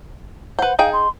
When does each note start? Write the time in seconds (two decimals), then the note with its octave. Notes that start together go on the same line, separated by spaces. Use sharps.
0.59 B4 C5 F#5
0.79 D#4 G#4 F5 G5
0.93 C6